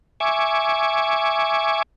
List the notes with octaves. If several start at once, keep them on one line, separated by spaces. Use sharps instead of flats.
E5 G#5 C#6 D6